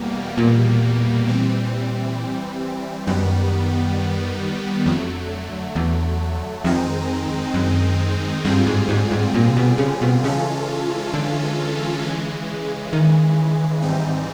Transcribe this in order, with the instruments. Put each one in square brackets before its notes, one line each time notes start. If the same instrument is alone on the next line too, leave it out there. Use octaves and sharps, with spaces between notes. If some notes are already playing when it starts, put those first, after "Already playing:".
Already playing: [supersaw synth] E2 B2 G3 A#3
[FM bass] A#2
[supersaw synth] E3 G3 C4
[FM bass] F#2 [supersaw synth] D#3 G3 B3
[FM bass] F2 [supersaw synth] D3 F#3 A3
[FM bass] E2
[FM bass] F2 [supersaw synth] D#3 G#3 C4 D#4
[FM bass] F#2
[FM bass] G2 [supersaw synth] D3 G3 C4 F4 G#4
[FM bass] G#2
G#2
G#2
A#2
C3
B2
C#3
B2
[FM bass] C#3 [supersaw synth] E3 G#3 C#4 F4 A4
[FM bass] D3
[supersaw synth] C#3 E3 G#3
[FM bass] D#3
[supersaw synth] G#2 E3 G3 C4 D#4